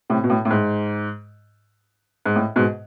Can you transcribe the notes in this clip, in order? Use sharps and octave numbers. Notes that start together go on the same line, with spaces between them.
A2 C3
B2
A2
A2
G#2
G#2
A2
G#2 B2